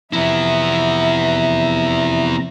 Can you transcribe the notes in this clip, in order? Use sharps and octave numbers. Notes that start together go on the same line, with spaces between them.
F2 C3 B3 E4 E5 A#5